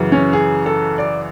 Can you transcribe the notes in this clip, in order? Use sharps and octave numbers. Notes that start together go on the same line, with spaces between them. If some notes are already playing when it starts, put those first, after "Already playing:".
Already playing: F#2 C#3 E3
C#4
G#4
A4
D5